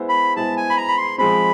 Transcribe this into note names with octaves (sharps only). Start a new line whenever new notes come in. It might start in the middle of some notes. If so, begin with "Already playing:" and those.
Already playing: G#3 B3 E4 C5
B5
G#3 B3 E4 G#4 C5 A5
G#5
B5
A#5
B5
C6
F3 G#3 C4 B5